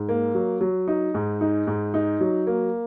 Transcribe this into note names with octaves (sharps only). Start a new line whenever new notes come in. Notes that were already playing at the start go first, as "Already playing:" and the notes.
Already playing: G#2
A#3
F#3
F#3
D#4
G#2
D#4
G#2
D#4
F#3
A#3